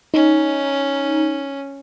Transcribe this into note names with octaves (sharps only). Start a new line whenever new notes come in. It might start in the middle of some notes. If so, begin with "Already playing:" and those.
C#4 D#4